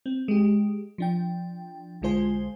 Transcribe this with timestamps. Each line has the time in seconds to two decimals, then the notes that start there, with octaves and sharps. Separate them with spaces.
0.06 C4
0.28 G#3 G4
0.98 F3 D4 G5
2.02 B1 D3 G#3 F4 C5 G#5